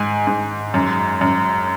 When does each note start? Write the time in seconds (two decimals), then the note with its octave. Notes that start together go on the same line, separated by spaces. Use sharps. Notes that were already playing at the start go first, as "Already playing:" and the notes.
Already playing: G#2 G#5
0.27 G#2
0.74 F#2
1.21 F#2